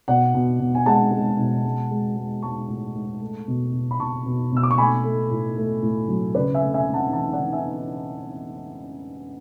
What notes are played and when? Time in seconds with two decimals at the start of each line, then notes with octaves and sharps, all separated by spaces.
0.08 B2 D5 F#5
0.34 B2
0.60 B2
0.75 G#5
0.86 G#3 F#5 A5
1.12 G#3
1.39 B2
1.65 G#3
1.91 G#3
2.17 G#3
2.42 G#3 A5 C#6
2.69 A2
2.95 G#3
3.21 A3
3.48 B2
3.73 B2
3.91 B5
4.00 B2 A5 C#6
4.26 B2
4.52 B2 E6
4.63 D6
4.71 C#6
4.78 A3 G#5 B5
5.04 A3
5.31 A2
5.57 A3
5.83 A2
6.08 F#3
6.34 C#3 B4 D5
6.54 E5 G#5
6.61 A3
6.74 E5 G#5
6.87 A3
6.94 F#5 A5
7.13 E3 F#5 A5
7.33 D5 F#5
7.40 E3
7.53 E5 G#5